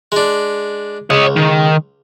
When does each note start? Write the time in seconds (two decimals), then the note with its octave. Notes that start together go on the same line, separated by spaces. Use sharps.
0.12 G#3 D4
1.10 C#2 C#5 D#5
1.36 D#3